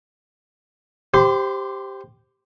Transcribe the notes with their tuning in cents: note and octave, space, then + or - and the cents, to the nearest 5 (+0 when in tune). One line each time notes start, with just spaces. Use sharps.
G4 +0 C5 +0 C6 -45